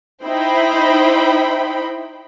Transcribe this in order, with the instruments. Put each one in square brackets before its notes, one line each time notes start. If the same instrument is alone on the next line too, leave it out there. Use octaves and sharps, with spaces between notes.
[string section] D#4 E4 C5 G5 B5